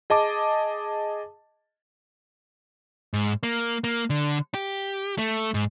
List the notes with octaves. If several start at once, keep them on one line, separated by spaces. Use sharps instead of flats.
G#4 D#5 A5 D6
G#2
A#3
A#3
D3
G4
A3
G#2